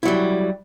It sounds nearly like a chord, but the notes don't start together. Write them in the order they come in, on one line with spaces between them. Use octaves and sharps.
E4 F#3 G3